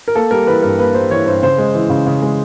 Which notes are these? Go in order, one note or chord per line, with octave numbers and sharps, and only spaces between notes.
A#4
A#3 A4
G3 A#4
E3 B4
G2 A#4
A#3 B4
G3 C5
E3 C#5
G2 C5
C#3 C5
G#3
E3
C#3
C#3
G#3